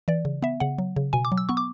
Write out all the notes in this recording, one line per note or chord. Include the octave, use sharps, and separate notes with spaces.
E3 D5
C#3
B3 E5
C#3 F#5
F#3
C#3
B2 G#5
D6
F#3
E6
B3 C#6
D6